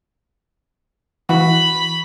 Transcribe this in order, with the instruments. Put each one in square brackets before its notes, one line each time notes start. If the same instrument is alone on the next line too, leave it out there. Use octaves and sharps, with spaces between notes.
[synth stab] E3 [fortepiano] F#4 [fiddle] B5